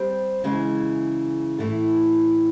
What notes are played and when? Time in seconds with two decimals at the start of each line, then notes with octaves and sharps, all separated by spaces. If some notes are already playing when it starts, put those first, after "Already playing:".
Already playing: G3 C4
0.44 C#3 E3 G#3
1.58 A2 E3 A3